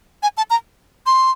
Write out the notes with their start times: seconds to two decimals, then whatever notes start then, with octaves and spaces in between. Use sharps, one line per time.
0.23 G#5
0.37 A5
0.50 A#5
1.06 C6